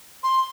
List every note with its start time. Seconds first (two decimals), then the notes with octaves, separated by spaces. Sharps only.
0.23 C6